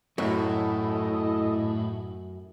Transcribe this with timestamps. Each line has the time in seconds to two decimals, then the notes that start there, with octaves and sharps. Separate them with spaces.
0.18 F#2 A2 F#3 A3 E4 A4 D#5